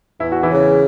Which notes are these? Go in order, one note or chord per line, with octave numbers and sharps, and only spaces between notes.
E2 E4
F#4
E3 E4
C#3